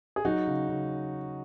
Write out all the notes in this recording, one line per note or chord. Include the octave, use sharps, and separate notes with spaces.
G#4
F#3 D#4 F#4
C#3
C#3